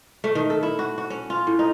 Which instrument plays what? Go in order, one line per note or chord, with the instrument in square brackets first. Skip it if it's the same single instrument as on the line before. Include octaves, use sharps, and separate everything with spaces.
[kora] A3
D#3
A4
E4
F#4
F#4
C#4
F4
A2
D#4